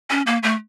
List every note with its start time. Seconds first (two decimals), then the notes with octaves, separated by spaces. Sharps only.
0.10 C#4
0.27 A#3
0.43 A3